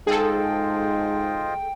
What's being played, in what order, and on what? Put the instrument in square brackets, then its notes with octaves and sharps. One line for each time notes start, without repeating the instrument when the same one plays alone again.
[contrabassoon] G#2 [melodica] F4 C5 D#5 [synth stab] G#4 A4 [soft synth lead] G5